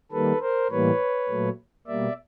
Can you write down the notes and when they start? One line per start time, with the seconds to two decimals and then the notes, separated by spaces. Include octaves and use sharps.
0.11 D#3 G3 A#3 A4 B4
0.41 A#4 C5
0.70 A2 E3 G3 A#3 B4 C#5
1.28 A#2 F#3 A3
1.87 B2 G3 A#3 D5 E5